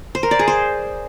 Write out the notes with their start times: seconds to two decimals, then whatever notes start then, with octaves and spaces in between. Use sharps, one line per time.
0.15 C5
0.23 A#4
0.31 D5
0.39 G#4
0.48 C5